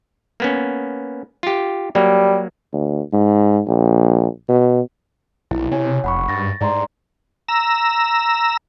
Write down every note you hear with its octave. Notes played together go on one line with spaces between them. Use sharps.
A#3 B3 C#4
F4 G4
F#3 G3 A#3
D2
G#2
A#1
B2
B1 E4
C3 C#5 G#5
F1 F#5 B5 C#6
G2 A6 A#6
G#2 D5 A#5 C6
A#5 E6